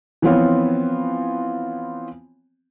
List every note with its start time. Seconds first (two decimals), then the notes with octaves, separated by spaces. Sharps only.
0.22 E3 F3 B3 C4 F4 C#5